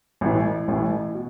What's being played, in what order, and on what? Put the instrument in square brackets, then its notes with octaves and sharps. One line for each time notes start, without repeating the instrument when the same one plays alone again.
[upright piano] A1 A2 E3
A1 A2 E3
B2